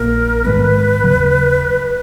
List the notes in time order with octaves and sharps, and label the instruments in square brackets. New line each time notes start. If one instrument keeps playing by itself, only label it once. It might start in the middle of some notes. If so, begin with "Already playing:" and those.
Already playing: [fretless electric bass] A#1 A#2 A#3 [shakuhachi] A#4
[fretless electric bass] G#2 D#3 G#3 B3 [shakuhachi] B4
[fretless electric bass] D#2 C#3 F#3